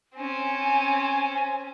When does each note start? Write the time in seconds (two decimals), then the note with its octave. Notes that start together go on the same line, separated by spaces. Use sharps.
0.17 C4 C#4 G#5